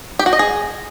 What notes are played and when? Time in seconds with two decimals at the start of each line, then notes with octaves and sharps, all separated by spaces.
0.19 G4
0.26 F#4
0.33 D#5
0.39 G#4